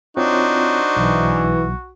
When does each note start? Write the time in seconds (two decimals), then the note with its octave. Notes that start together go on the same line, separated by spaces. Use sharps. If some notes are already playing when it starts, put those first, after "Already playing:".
0.17 C4 D4 D#4 F4 F#4 C5 C#5
0.97 B1 E3